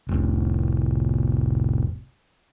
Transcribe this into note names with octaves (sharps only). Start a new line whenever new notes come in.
F1 C2